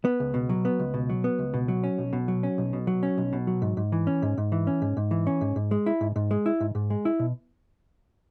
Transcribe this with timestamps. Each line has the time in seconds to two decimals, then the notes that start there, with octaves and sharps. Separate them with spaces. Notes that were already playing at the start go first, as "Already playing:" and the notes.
0.05 B3
0.20 C#2
0.34 B2
0.49 F#3
0.65 B3
0.79 C#2
0.94 B2
1.10 F#3
1.24 B3
1.39 C#2
1.54 B2
1.68 F#3
1.84 C#4
1.98 B1
2.13 B2
2.28 F#3
2.43 C#4
2.58 B1
2.73 B2
2.87 F#3
3.03 C#4
3.18 B1
3.33 B2
3.47 F#3
3.62 G#2
3.77 G#2
3.92 E3
4.07 C#4
4.22 G#2
4.38 G#2
4.52 E3
4.67 C#4
4.82 G#2
4.97 G#2
5.11 E3
5.27 C#4
5.41 G#2
5.56 G#2
5.71 G#3
5.86 E4
6.01 G#2
6.16 G#2
6.31 G#3
6.46 E4
6.60 G#2
6.75 G#2
6.90 G#3
7.05 E4
7.20 B2